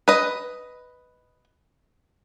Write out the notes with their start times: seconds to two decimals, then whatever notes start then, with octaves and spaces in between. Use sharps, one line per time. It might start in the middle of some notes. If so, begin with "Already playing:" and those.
0.08 B4 D#5